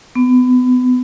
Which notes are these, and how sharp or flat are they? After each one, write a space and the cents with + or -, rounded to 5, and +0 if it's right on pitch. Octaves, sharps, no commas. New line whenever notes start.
B3 +30